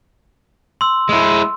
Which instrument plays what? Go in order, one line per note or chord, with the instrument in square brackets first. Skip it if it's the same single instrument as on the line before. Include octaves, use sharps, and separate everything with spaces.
[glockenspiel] C6 E6
[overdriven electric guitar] G#3 E4